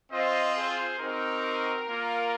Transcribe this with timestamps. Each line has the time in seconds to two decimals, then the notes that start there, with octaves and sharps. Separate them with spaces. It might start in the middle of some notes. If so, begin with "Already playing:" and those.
0.11 C4 F4 C5 D#5
0.55 G#4 C5
0.99 C4 D#4 F#4 A#4
1.87 A#3 F4